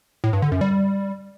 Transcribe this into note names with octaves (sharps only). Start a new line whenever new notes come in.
A2
G2
D3
F#2
G3